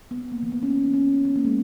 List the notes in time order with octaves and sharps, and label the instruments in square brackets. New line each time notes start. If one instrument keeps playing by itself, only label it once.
[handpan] B3
A#3
E3
B3
C#4
B3
C#4
B3
B3
A#3
G#3